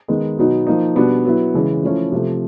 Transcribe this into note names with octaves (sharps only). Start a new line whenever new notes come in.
D#3 G#3 B3 D#4
B2 F#3 B3 D#4
F3 A#3 D#4
B2 G3 B3 D4
F#3 B3 E4
C#3 E3 G#3 C#4
F3 A3 C#4 E4
C3 F3 A3